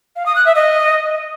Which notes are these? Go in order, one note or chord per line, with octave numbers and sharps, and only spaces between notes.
F5
D#6
F#6
E5
D#5